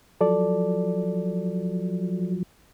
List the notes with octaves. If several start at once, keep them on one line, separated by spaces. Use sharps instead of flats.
F3 F#3 A4 D5